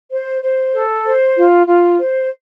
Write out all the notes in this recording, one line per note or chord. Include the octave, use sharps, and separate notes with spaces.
C5
C5
A4
C5
F4
F4
C5